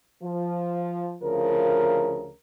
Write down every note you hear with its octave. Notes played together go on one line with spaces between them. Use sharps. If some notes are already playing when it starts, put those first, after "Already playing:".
F3
D2 C#3 F3 A#4